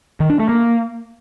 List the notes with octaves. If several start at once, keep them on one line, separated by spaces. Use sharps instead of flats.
D#3
D4
A3
A#3